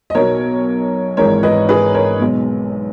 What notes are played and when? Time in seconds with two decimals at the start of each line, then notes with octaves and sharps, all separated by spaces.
0.10 D#5
0.15 B1 B2 F#3 A#4 C#5
1.17 G#1 G#2 E3 G#3 A#4 C#5
1.43 B4 D#5
1.69 G#4 B4
1.94 A#4 C#5
2.20 B1 B2 G#3